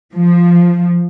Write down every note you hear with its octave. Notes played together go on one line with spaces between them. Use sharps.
F3